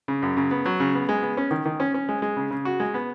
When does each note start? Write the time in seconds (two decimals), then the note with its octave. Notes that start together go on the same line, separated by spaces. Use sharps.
0.08 C#3
0.22 F#2
0.37 C#3
0.51 B3
0.66 F#3
0.80 C#3
0.95 B3
1.09 G#3
1.23 B3
1.37 C#4
1.51 D#3
1.65 D#3
1.80 C#4
1.94 C#4
2.09 G#3
2.22 G#3
2.37 C#3
2.51 C#3
2.65 F#4
2.80 G#3
2.94 B3